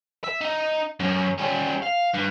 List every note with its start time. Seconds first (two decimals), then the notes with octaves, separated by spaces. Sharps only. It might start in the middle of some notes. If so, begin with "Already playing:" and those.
0.24 E5
0.41 D#4
1.00 F#2 C#4
1.39 G3 C#4
1.83 F5
2.15 G2